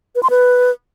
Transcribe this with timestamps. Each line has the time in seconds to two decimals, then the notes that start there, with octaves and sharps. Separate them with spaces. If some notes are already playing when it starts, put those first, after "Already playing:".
0.15 B4
0.23 C6
0.30 B4